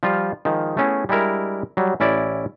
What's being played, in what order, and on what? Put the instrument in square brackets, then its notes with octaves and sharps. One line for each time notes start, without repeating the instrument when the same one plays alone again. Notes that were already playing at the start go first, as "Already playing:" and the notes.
[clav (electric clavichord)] F3 G3 F4
D#3 F3 G#3
A3 B3 C#4 E4 G#4
G3 G#3 D4 E4 A#4
F#3 G3
A1 C#4 E4 D5